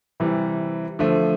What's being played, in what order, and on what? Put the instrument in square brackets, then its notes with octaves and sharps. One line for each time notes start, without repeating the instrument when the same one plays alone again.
[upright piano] C3 E3 G3
D3 F3 A3